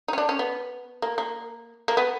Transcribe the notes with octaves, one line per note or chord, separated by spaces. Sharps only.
D#4
C#4
D4
C#4
B3
A#3
A#3
A#3
B3